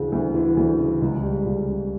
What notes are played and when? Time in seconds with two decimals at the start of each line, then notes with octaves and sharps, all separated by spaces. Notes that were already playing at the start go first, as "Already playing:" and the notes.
Already playing: D2 C#3 E3
0.12 D2
0.35 E3
0.57 D2
0.79 C#3
1.02 C#2
1.23 G3
1.45 C#2
1.68 C#3